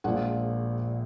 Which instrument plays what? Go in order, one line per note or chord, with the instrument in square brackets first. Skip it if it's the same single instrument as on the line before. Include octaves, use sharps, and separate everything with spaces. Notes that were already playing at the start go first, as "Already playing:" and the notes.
[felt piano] A#1 A#2 F3 G#3 F#5